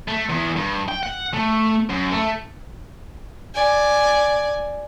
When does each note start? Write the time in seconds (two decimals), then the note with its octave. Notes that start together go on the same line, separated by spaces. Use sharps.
0.08 A3
0.30 E2
0.57 G2
0.89 G5
1.03 F#5
1.34 A3
1.90 F#2
2.12 A3
3.55 D5 G#5